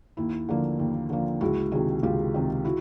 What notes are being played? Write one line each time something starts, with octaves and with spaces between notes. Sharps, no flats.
D#2 E4
D3 F3 A#3
D#2
D3 F3 A#3
C#2 E4 F#4
C3 D#3 F#4 G#4
C#2 F4 G4
C3 D#3
E4 F#4